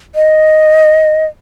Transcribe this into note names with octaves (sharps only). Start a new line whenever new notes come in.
D#5